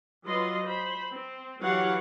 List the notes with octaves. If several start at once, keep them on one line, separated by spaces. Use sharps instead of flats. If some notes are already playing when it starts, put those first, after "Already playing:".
F#3 F4 B4 D#5 C6
C5 B5
C4
E3 F#3 G4 C#5 F5 F#5